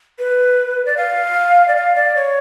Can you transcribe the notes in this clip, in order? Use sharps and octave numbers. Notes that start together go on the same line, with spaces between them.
B4
D5
F5
D5
F5
D5
C#5